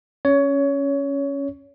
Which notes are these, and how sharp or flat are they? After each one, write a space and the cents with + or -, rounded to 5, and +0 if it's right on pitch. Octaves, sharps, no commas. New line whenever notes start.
C#4 +0 C#5 +20